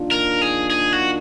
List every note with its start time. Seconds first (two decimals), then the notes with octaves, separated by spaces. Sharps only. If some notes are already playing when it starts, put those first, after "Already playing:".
Already playing: D#3 A#3 D4 F4
0.11 A#4
0.42 G#4
0.70 G#4
0.93 F#4